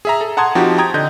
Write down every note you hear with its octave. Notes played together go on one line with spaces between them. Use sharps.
G#4 E5 A#5
A4
F#5 A5 A#5 C6 D#6 G#6
F3 C4 D#4 F#4 G4
G5 A#5 D#6 G#6
D3 D#5 G6